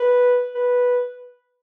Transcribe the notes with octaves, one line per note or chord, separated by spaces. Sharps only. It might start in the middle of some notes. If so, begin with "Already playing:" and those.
Already playing: B4
B4